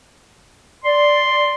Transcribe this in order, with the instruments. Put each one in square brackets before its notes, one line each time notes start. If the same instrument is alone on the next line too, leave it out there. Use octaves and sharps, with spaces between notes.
[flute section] D5 [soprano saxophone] C6